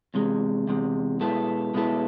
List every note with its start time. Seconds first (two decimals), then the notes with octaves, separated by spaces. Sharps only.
0.14 E2 C3 G#3
0.67 E2 C3 G#3
1.20 B2 G#3 B3 E4 A4
1.74 B2 G#3 B3 E4 A4